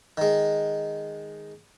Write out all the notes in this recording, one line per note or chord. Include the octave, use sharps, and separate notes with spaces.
D#3 G#3